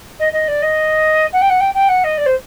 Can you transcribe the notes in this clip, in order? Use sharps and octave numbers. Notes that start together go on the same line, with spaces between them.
D#5
D#5
D5
D#5
F#5
G5
F#5
G5
G5
F#5
D#5
D5
C5